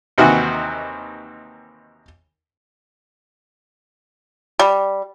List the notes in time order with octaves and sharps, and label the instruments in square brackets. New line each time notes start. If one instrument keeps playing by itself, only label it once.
[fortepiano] D#2 C3 D#3 E3 F#4
[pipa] G3